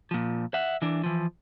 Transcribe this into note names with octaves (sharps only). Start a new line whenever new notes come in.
A#2 F3
E5 F#5
E3 D4
E3 F3